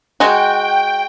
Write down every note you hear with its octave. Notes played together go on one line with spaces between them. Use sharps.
G#3 F#4 G5